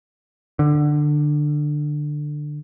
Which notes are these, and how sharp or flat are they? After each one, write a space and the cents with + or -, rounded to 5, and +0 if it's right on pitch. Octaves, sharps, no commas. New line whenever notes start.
D3 +15